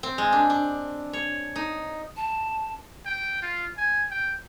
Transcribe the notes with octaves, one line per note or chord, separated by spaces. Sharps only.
C4
G#3
D4
D4
C#5
D#4
A5
G5
F4
G#5
G5